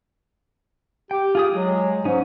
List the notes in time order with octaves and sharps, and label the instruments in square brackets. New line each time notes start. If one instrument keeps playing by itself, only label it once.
[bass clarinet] G4 [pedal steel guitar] G5
[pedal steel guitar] F4 G#4 D#6
[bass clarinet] F#3 [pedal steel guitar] G#3
[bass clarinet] G#2 [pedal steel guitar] C#4 D#4